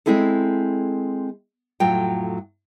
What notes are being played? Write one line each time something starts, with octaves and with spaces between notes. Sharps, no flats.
G#3 C4 E4 G#4 A4
F2 A2 F#3 F4 G5